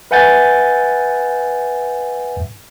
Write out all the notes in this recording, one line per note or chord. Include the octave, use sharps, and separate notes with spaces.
B4 E5 F#5 G#5 G6 A6